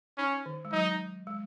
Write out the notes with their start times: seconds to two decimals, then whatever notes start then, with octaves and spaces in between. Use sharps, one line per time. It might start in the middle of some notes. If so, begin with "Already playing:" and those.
0.18 C#4 D#4
0.46 D#3
0.65 G#3
0.72 F#3 D#4
1.27 G#3